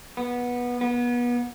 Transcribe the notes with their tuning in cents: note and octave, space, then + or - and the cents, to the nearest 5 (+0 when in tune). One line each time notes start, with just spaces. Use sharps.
B3 -15
B3 -30